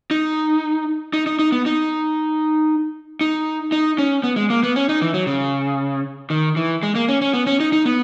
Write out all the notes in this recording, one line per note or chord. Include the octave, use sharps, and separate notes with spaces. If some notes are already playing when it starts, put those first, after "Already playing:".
D#4
D#4
D#4
D#4
B3
D#4
D#4
D#4
C#4
B3
G#3
A#3
B3
C#4
D#4
E3
F#3
C#3
D#3
E3
G#3
A#3
C#4
C#4
B3
C#4
D#4
D#4
B3